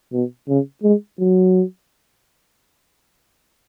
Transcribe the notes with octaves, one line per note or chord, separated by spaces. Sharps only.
B2
C#3
G#3
F#3